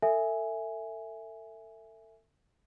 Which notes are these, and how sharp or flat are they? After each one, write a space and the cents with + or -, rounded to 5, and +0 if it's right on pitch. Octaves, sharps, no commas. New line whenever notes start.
A4 +35 E5 +0 G#5 +0